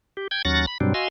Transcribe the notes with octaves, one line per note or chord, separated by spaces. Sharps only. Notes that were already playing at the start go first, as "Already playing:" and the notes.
G4
G5 G6 G#6
D#2 F#3 C#4 F#5 A6 A#6
B5
G2 B2 F#3 G3 C4 D4
F#4 D#5 F5 G#5 C6 E6